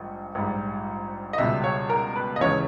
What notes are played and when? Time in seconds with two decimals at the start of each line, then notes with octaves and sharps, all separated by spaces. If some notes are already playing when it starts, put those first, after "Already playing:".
Already playing: A#1 G#2 D#3 G3
0.35 A#1 G#2 G3
1.33 D#5
1.38 C#2 B2 G3 E5
1.64 C#5
1.90 A#4
2.15 B4
2.36 D#5
2.41 E1 D#2 C#3 E3 G#3 C#5